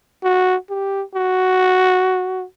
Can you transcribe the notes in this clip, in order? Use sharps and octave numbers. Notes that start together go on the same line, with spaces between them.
F#4
G4
F#4